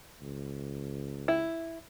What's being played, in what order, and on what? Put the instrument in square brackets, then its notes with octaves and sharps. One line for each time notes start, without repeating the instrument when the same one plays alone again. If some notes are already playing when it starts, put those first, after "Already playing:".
[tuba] C#2
[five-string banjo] E4